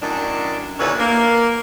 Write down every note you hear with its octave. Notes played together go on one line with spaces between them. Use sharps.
F#2 A2 D#3 D4
D#2 A#2 D3 C#4 E4 B4
A#3